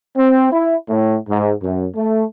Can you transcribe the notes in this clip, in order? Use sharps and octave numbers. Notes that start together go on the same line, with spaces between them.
C4
E4
A2
G#2
F#2
A3